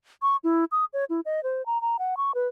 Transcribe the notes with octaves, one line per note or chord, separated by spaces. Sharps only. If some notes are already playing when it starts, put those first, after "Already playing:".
C#6
E4
D#6
C#5
E4
D#5
C5
A#5
A#5
F#5
C#6
B4